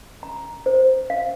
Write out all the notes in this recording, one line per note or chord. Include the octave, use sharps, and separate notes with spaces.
A#5
C5
F5